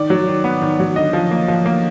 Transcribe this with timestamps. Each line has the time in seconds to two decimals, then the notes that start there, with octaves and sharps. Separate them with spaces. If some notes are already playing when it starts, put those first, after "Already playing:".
Already playing: D#3 D5
0.10 F#3
0.28 D#3
0.44 B3
0.62 D#3
0.80 F#3
0.96 D3 D#5
1.13 F3
1.31 A#3
1.48 F3
1.65 A#3